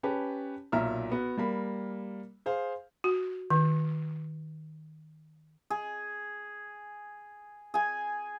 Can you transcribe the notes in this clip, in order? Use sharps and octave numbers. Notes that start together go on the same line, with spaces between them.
C#4 G4 B4 A5
B1 A#2 E5 A#5 F6
B3 F#4
G3 A#3 B5
G#4 C5 F5
F#4
D#3
G#4
G#4 G#5